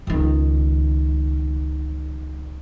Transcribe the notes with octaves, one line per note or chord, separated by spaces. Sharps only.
C#2 D#3